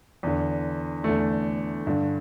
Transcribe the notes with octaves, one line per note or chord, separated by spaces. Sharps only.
E2 D3
E2 D3 A3
G2 D3